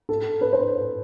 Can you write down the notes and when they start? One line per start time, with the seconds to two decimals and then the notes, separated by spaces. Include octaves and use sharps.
0.09 A4
0.41 B4
0.53 C5